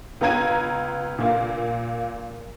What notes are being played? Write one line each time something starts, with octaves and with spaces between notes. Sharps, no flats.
C#2 B3 F4 A#5 G#6 D#7
A#2 A#3 F4